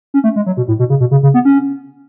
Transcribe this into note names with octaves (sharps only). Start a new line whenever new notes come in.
C#4
A3
G#3
F#3
B2
A2
B2
C#3
B2
C#3
C#3
B3
C#4